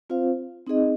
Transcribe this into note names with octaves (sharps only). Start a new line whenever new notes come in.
C4 F4 C5 F5
C4 D#4 G#4 D#5